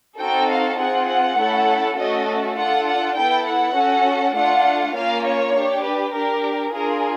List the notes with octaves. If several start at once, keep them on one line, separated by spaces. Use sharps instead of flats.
C4 D#4 F#4 A4 G5
F5
C4 F4 G#4 F#5
F#5
A3 C#4 E4 A4
A3 C#4 F#4 A4 D#5
D4 F4 A4 F#5
F#5
B3 E4 A4 G5
F#5
C#4 F#4 A4
A3 D4 F4 F#5
A#3 C#4 F4 F5
C#5
D4 G4
B4
D4 G4 A#4
D4 F4 G#4 A#4